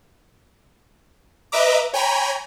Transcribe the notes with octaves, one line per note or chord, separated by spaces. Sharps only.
B4 D#5 E5 A#5 D6
C#5 G5 G#5 A#5 B5